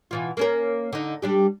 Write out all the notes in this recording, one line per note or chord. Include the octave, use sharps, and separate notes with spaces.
B2 E3 F4
A#3 C#4 A#4
D3 D#4
G3 D4 G4